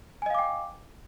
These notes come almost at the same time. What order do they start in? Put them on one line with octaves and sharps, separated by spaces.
G#5 D#5 F5 D6 G5